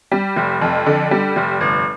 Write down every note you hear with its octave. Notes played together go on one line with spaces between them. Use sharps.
G3
F1
F2
D3
G3
F1
G1